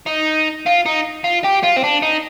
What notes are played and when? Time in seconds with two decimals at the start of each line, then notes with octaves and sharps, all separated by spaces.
0.07 D#4
0.66 F4
0.86 D#4
1.24 F4
1.44 G4
1.63 F4
1.76 C4
1.84 D4
2.02 D#4